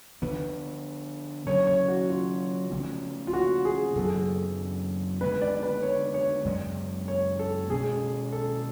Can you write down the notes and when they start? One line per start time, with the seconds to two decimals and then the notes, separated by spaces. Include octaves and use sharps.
0.22 D3 F3 B3 B4
1.47 C#3 F#3 C#4 C#5
1.67 C#5
1.88 F#4
2.10 F4
2.71 C#3 F3 A3 C#4
3.27 F4
3.33 F#4
3.65 G#4
3.95 F#2 C#3 F#3 B3 A4
4.05 G#4
4.16 A4
5.21 D3 G#3 B3 B4
5.41 D5
5.63 B4
5.83 C#5
6.14 C#5
6.45 F#2 C#3 G#3 D5
7.08 C#5
7.39 A4
7.70 B2 G#3 C#4 G#4
8.32 A4